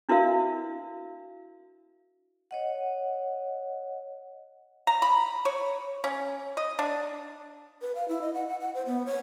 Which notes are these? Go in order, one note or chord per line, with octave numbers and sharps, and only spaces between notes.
D4 E4 F#4 A#4 E5 F5
C#5 D#5 F#5
A#5
B5
C#5
C#4
D#5
D4
B4
F5
E4
D#5
F#5
F#5
F#5
C5
B3
C#5